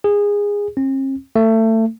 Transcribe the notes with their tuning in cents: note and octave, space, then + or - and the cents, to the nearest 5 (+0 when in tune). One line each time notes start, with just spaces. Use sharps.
G#4 -20
C4 +45
A3 +25